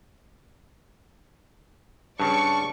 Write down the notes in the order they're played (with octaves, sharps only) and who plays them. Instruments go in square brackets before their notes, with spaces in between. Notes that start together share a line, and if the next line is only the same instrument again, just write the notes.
[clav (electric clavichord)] G2 C#3 [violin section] D5 C#6 [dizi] A5